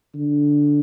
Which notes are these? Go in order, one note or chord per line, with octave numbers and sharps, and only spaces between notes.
D3